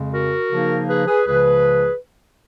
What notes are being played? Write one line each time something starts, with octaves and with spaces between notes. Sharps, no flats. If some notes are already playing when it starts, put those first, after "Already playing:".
Already playing: F2 C#3 G#3
F#4 A#4
C#3 F3 A#3 D#4
G#4 B4
G#4 B4
C#2 C#3 F3 G#4 B4